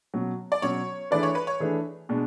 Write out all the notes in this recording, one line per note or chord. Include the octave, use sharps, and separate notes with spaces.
B2 F#3 C#4
D5
B2 F#3 C#4 C#5
E3 A3 D4 G#4 B4 D5
C#5
B4
C#5
E3 A3 D4 G#4 B4
B2 G#3 D4